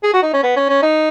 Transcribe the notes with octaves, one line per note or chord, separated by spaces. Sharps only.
G#4
F#4
D#4
C#4
B3
C#4
C#4
D#4